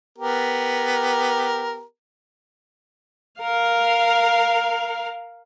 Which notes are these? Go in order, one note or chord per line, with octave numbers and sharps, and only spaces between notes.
B3 G4 A#4
A#4 F5